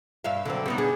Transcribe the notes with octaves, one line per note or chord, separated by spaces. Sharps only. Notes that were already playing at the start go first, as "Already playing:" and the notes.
G2 E5 F5
D3 F#3 C4
G3 B3 D#4
D4 G#4